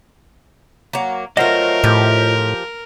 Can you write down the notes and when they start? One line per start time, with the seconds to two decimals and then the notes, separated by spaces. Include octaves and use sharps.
0.93 F#3 A#3
1.37 F#3 A3 F4 A#4 C5 D#5
1.84 A2 F3 G4